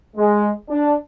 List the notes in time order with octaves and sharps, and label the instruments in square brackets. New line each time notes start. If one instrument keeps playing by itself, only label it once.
[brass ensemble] G#3
D4